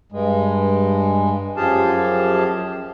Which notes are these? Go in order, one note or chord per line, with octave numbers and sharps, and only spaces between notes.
G2 G#3
F#2 F3 G4 G#4 F5 A5